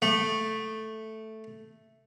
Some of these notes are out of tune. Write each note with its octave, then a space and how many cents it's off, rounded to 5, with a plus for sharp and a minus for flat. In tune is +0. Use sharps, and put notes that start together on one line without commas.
A3 +0 D6 +30